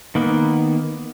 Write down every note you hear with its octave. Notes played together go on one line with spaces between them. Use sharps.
D#3 A#3 B3